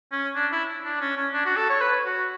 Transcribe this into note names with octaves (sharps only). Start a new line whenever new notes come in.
C#4
D4
E4
D4
C#4
C#4
D4
F#4
A4
C#5
B4
F#4